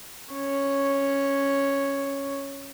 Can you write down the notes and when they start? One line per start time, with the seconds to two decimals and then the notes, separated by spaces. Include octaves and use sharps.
0.33 C#4 C#5